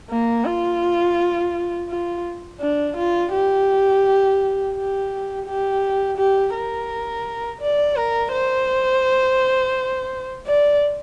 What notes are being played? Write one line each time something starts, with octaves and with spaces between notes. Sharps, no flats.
A#3
F4
F4
D4
F4
G4
G4
G4
G4
A#4
D5
A#4
C5
D5